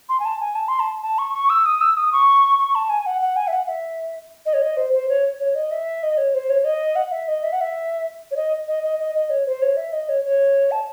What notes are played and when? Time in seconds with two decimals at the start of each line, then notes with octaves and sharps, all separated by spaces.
0.09 C6
0.20 G#5
0.25 A5
0.40 G#5
0.55 A5
0.68 C6
0.80 A5
1.02 A5
1.18 C#6
1.34 C#6
1.50 E6
1.66 D#6
1.81 E6
1.97 D#6
2.12 C#6
2.59 C#6
2.75 A5
2.89 G#5
3.06 F#5
3.21 F#5
3.36 G#5
3.47 E5
3.53 F#5
3.68 E5
4.46 D#5
4.53 C#5
4.62 D#5
4.77 C5
4.93 C5
5.09 C#5
5.40 C#5
5.55 D#5
5.71 E5
6.03 D#5
6.17 C#5
6.34 C5
6.50 C#5
6.64 D#5
6.96 F#5
7.12 E5
7.28 D#5
7.43 E5
7.52 F#5
7.61 E5
8.31 C#5
8.36 D#5
8.68 D#5
8.83 D#5
8.99 D#5
9.15 D#5
9.30 C#5
9.46 C5
9.62 C#5
9.77 E5
9.93 D#5
10.09 C#5
10.24 C#5
10.71 A5